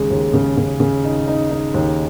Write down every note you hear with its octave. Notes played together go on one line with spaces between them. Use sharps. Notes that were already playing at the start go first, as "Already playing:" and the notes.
Already playing: D#2 C#3 G#3 D#4
D#2
C#3
C#3
C#3
D#4
D#4
D#4
D#2